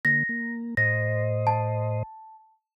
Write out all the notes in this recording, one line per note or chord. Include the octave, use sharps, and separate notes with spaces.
D3 A#3 A#6
A#3
A2 C5 D#5 A#6
A5